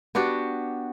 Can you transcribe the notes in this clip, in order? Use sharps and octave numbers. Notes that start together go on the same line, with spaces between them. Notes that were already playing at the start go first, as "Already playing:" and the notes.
B3 D4 F#4 G4